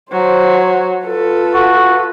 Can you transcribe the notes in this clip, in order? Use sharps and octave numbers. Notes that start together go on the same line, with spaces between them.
F#3 C5
F4 A4 B4
F#4